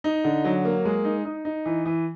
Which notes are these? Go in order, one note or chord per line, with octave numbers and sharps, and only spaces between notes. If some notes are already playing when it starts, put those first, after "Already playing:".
D#4
D3
F#3
A#3
G#3
D#4
D#4
D#4
E3
E3